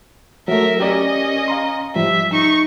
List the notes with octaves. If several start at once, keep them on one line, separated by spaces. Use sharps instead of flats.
F#3 A3 A#4 E5
C#4 G4 A#4 D5 D#5
F5 A#5 C6
G#2 F3 G3 E5
D#4 C#6